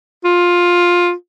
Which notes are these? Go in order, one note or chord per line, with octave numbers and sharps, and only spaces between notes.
F4